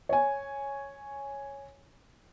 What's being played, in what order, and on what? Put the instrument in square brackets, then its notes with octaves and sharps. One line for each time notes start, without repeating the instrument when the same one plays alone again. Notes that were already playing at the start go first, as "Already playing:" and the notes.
[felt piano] C#5 G#5